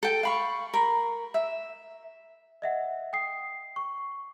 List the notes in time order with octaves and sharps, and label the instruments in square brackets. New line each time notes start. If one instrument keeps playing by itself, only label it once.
[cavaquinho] A4 G5
F5 B5 C#6
A#4 B5
E5
[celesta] D#5 E5 F#5
G5 D#6 C7
C#6